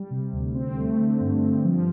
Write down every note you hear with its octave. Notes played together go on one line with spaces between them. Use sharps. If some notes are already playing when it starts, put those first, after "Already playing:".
Already playing: G3
C3
D2
C4
A3
D3
G2
G2
F3